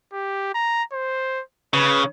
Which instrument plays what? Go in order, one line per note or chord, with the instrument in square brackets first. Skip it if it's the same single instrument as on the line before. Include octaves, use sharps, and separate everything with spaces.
[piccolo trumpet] G4
A#5
C5
[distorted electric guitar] C#3 [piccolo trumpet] B4